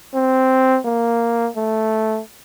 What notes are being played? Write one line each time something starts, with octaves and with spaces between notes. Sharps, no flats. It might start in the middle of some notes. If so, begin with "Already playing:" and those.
C4
A#3
A3